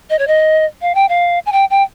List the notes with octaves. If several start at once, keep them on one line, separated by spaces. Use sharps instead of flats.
D#5
C#5
D#5
F5
G5
F5
G#5
G5
G5